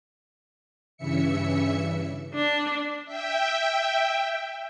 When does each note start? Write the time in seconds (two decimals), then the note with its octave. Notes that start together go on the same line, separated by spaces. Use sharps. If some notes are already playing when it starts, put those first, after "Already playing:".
0.97 G2 C#3 E3 E5 C#7
2.34 D4
3.06 E5 G5